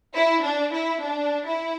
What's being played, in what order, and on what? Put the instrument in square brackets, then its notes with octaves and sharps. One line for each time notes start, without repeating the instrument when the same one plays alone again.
[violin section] E4
D4
E4
D4
E4